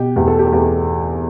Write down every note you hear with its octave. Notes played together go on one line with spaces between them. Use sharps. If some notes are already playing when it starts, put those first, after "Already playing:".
Already playing: B2 G4
E2 G4
A4
G4
A4
E2 G4